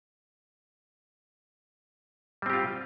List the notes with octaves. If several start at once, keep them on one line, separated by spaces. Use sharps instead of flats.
G3 C4 F4 G4